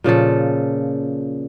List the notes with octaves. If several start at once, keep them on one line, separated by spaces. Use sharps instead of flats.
A#2 C#3 F3 A4